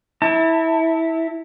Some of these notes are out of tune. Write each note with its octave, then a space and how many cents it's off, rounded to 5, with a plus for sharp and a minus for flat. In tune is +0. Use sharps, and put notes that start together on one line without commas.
E4 -15 A5 +35